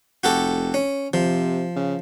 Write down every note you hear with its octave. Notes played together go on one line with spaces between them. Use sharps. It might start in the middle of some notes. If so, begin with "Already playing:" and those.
F1 F#4 G4 A4
C#4
C3 F3
C#3